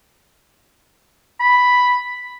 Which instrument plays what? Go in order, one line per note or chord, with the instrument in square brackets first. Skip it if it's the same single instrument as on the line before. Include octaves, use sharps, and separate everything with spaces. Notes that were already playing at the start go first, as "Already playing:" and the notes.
[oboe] B5